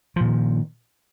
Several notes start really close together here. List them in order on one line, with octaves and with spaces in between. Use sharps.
F3 A#2 D#3